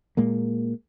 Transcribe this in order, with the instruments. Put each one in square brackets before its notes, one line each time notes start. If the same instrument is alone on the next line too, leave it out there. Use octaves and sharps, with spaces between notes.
[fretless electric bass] A#2 G#3 A#3